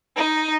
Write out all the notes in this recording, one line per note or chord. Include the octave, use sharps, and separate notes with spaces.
D#4